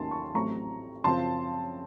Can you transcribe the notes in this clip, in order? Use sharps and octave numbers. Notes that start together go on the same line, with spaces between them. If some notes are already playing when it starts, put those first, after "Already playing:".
Already playing: D#2 D#3 A3 C#4 A5 C6
C#6
A1 A2 F#3 A3 C4 A#5 C#6
F#2 C#3 F3 C4 A5 C6